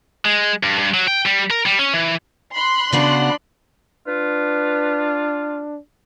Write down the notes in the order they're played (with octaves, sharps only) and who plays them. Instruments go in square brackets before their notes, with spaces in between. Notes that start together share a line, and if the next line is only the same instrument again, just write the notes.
[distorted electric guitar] G#3
G2
G2
F#3
G5
G3
A#4
G3
C#4
E3
[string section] B5 C6 F#6
[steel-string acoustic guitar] C#3 B3 F#4 [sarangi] D4
[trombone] D4 [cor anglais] F4 [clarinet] B4